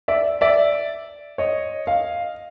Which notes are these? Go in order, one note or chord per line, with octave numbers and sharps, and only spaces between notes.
D5 E5
D5 E5
C#5 D#5
D#5 F5